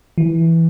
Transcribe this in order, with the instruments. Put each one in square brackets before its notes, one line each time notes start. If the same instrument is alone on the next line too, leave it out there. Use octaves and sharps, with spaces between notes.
[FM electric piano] E3